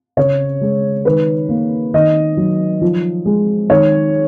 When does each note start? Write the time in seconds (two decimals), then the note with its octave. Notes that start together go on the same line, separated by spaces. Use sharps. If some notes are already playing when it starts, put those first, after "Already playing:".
0.17 C#3 C#5
0.61 G#3
1.05 D#3 B4
1.49 A#3
1.94 D#3 D#5
2.37 F#3
2.81 F3
3.26 G#3
3.70 D#3 C#5